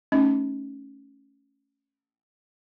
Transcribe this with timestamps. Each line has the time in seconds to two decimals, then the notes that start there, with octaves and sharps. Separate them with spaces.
0.12 A3 C#4 D#4